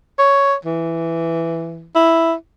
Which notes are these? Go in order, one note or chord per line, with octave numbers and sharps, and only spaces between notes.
C#5
E3
E4